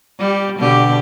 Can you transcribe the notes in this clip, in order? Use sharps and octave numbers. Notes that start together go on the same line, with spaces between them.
G3 G4
B2 D3 G4